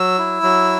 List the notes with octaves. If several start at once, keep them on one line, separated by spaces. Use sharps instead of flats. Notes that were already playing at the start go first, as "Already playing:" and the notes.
Already playing: F#3 E6
E4
F#3